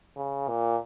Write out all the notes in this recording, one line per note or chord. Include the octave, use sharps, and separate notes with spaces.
C#3
A#2